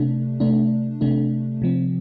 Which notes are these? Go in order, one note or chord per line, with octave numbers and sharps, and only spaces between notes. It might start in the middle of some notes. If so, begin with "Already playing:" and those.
Already playing: C3 A3 D4
C3 A3 D4
C3 A3 D4
C3 F3 C4